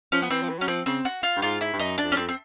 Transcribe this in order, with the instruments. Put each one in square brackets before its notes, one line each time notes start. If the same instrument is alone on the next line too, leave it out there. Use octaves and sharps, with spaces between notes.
[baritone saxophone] F3 [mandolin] C#4
[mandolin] B3
[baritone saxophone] E3 [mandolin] C4
[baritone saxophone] F3
E3
[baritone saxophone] F#3 [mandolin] C#4
[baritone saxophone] F3 [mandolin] C4
[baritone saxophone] C#3 [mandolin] C4
[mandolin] F#4
F4
[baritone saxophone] G2
[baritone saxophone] G#2 [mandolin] F4
[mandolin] E4
[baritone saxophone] G2
[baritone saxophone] F#2 [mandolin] D#4
[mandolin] D4
[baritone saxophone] F2
[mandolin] C#4
[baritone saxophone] F2 [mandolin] C4
[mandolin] C4